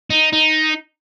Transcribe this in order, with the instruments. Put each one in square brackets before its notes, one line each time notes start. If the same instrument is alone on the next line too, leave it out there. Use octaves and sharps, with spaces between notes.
[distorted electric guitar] D#4
D#4